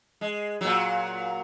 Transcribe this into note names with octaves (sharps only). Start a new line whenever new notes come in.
G#3
A#2 F#3